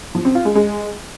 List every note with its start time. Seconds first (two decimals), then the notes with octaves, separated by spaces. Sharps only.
0.15 F3
0.25 C4
0.35 F4
0.45 G#3
0.55 G#3